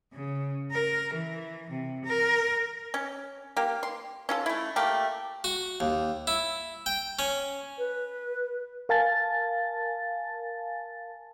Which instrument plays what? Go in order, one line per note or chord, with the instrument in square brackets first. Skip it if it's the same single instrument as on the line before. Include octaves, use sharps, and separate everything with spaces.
[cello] C#3
A#4
E3
C3
A#4
[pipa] C#4
A#3 G4
C6
C#4 F4 A4
A3 E4
A3 A#3 G4 F5
[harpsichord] F#4
D#2
E4
G5
C#4
[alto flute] B4
[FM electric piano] A#4 F5 G#5 A5 A6